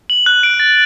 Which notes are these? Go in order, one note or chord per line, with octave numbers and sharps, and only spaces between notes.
F#7
F#6
D7
A6